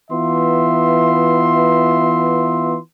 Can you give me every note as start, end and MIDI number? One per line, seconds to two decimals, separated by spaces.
0.11 2.77 52
0.11 2.77 59
0.11 2.77 65
0.11 2.77 76
0.11 2.77 84